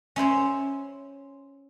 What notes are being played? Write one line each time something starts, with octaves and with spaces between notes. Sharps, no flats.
C#4 E4 C5 C#5